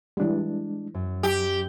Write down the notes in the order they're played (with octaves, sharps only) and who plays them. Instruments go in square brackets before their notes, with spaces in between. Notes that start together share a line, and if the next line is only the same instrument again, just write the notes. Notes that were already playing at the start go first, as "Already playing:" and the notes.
[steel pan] E3 G3 [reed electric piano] G#3 D4
[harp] F#2
[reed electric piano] F#3 [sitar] G4